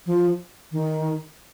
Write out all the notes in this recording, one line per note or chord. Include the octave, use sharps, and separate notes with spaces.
F3
D#3